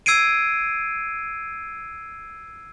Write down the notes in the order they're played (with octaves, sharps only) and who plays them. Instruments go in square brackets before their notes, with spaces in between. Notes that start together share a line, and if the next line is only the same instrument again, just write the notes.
[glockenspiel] E6 G#6 C7 D7 D#7